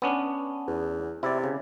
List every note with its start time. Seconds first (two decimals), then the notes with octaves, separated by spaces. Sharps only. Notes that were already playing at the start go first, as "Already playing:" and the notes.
0.02 B3 C#4 D4
0.67 E2
1.23 C3 E4 D5
1.44 C#3